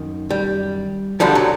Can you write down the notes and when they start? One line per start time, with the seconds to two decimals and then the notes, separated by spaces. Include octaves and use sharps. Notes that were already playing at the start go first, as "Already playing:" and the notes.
Already playing: F#2 D#3
0.31 G3
1.20 F#2 D3 F3 G3
1.35 F#3